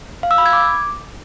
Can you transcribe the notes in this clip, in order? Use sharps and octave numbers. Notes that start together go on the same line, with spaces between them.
F5
E6
B5
G#6
D6